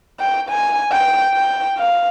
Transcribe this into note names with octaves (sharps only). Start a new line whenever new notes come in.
G5
G#5
G5
G5
F5